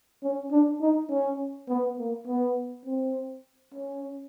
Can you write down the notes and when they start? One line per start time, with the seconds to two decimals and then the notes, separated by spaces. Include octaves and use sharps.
0.23 C#4
0.52 D4
0.81 D#4
1.10 C#4
1.68 B3
1.98 A#3
2.27 B3
2.86 C4
3.74 C#4